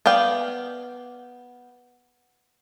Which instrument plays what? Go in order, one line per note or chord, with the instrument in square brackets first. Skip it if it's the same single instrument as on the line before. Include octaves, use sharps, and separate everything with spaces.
[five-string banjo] B3 D5 F5 G5